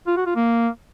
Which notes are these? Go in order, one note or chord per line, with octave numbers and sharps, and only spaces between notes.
F4
F#4
F4
A#3